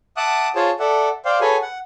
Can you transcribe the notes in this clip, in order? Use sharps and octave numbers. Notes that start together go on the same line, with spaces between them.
E5 F#5 A5 D6 D#6 F#6
F4 G#4 C5 C#5 A5
A4 D5 E5 F#5
C5 D5 F5 G5
F#4 G#4 A4 B4 C#5 G#5
F#5